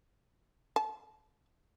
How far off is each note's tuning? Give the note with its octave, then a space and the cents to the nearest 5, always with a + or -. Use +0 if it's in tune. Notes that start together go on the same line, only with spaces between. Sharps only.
A5 -25